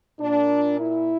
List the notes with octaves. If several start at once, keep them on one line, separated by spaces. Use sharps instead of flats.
A#2 D4
E4